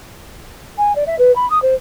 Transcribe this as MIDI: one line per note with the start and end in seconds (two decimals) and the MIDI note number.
0.78 0.95 80
0.96 1.04 74
1.07 1.16 76
1.19 1.34 71
1.36 1.49 83
1.50 1.61 87
1.62 1.75 72